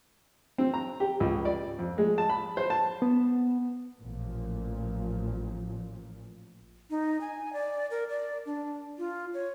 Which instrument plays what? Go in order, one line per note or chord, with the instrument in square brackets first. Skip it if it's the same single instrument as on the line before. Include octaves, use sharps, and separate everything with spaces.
[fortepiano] C4
A#5
G4
C#2
D5
F2
G#3
A5
B5
C5
A5
[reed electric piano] B3
[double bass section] A1 A#2 F3
[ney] D#4
G#5
D5
A#4
D5
D4
F4
C#5